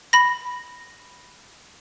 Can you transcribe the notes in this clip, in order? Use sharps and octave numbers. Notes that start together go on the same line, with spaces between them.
B5 A#6